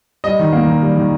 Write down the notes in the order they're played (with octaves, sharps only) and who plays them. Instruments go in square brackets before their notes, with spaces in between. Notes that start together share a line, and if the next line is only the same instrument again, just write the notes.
[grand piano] G3 D#5
D#3
A#3
D#3
G3
D#3